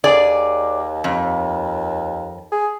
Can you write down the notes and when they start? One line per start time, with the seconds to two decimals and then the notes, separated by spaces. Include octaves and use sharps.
0.04 D#2 G#4 D5
1.04 F2
2.52 G#4